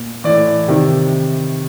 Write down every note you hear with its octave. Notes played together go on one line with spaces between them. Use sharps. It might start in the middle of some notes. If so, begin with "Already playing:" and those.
Already playing: A#2
A2 E3 D5
C3 D#3